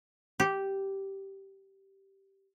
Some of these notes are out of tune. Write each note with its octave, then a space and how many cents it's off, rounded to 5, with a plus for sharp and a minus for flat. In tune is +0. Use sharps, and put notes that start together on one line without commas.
G4 -10